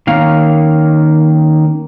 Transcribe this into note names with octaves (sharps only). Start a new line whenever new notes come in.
D#3 A#3 C#4 F5